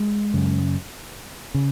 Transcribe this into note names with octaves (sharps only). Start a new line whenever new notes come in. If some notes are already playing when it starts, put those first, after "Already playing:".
Already playing: G#3
F#2 C#3
C#3